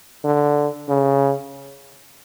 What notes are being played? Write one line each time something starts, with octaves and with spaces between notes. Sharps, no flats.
D3
C#3